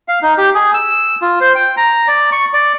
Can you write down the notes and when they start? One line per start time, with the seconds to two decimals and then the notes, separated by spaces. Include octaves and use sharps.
0.08 F5
0.23 D#4
0.38 G4
0.55 G#4
0.74 E6
1.22 F4
1.41 C5
1.55 G5
1.77 A#5
2.08 D5
2.32 C#6
2.53 D5